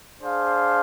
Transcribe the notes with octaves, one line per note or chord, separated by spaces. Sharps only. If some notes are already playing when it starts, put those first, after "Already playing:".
D4 G#4 C5 F5